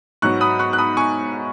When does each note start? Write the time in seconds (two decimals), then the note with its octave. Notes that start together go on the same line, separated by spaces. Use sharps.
0.22 G#2 F#3 B3 C#6 F#6
0.41 B5 D#6
0.59 C#6 F#6
0.73 F#6
0.78 B5 D#6
0.97 G#5 C#6